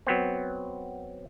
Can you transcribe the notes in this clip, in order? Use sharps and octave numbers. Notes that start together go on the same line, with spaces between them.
F#3 B3 C4